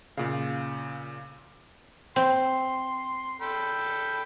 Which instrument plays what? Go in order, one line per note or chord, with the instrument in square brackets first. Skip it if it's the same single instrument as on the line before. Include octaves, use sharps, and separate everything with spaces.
[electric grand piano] A#2 C#3 [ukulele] F5
[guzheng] C4 [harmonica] C6
[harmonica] A4 G5 B5